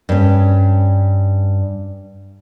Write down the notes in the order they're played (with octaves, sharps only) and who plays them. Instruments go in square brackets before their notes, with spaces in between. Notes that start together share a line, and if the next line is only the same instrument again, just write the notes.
[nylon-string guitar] G2 C#4